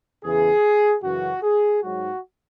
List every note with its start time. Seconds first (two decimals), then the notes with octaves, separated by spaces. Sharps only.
0.24 E2 C#3 E3 G#4
1.03 F#2 C#3 E3 F#4
1.43 G#4
1.83 G#2 F#3 F#4